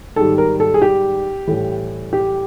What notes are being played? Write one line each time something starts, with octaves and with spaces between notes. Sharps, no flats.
G#2 D#3 G3 A4
A#4
A4
G#4
G4
A2 E3 G3
G4